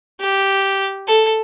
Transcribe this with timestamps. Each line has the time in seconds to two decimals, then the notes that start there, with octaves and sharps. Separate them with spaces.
0.20 G4
1.07 A4